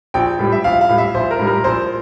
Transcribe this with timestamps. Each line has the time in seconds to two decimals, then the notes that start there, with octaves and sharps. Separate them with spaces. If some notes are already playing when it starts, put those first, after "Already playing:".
0.14 A#1 G5
0.39 A2 G3
0.52 E5
0.64 A#1 F5
0.81 F5
0.89 A2 G3
0.98 E5
1.14 A#1 C5
1.31 A#4
1.39 A2 G3
1.47 A#4
1.64 A#1 C5